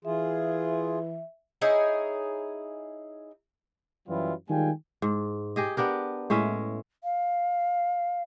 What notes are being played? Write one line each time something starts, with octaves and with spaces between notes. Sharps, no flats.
E3 F4 G#4 E5
D#4 E4 G#4 C#5
F#2 E3 F#3 G3 E4 F4
D#3 G3 G#3 F4 G5 G#5
G#2
G4 G#4 D#5
B3 D4 G4 A#4
A2 G#3 C#4 E5
F5